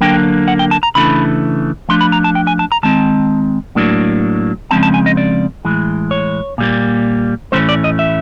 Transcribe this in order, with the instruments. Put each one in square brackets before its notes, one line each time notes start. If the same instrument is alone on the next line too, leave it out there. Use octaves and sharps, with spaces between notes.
[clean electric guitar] D3 F#3 A#3 D4 G5
F#5
G5
A5
A#5
C#3 E3 A3 D4 B5
F3 A3 D4 C6
B5
A#5
A5
G5
G#5
A5
A#5
D#3 G#3 C4 A5
A2 F#3 A#3 D4
C#3 F3 G#3 C4 A5
A5
G#5
D#5
D5
A2 E3 G#3
C#5
A#2 G3 A#3
A2 E3 A3 C#4 C5
D5
D#5
E5